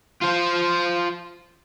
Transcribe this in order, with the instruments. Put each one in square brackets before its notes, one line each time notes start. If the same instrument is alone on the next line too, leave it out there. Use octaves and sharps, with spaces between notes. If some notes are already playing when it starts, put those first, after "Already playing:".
[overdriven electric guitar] F4 C5